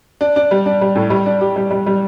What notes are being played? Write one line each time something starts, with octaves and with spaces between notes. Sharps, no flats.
D4
D4
G3
D4
G3
A2
G3
D4
G4
G3
G3
G3